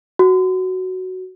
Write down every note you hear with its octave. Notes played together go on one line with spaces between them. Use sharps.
F#4